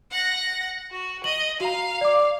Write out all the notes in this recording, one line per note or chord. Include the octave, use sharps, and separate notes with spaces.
F#5 A#6
F#4
D#5 F#7
F#4 F5 A#5
D5 D6